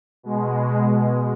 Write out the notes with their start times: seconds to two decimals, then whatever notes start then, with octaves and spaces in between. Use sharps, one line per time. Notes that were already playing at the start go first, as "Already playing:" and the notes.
0.23 B2 G#3